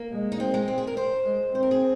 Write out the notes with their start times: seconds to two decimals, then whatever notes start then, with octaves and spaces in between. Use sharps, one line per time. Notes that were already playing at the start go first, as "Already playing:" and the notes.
Already playing: A#3
0.12 G#3
0.32 D#4
0.40 C4
0.54 G#3
0.68 C4
0.78 G#4
0.87 A#4
0.97 C5
1.24 G#3
1.53 C4 C5
1.63 A#4
1.71 G#4